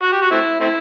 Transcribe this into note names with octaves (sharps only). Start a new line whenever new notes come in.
F#4
G4
F#4
A3 C4 E4
A3 C4 E4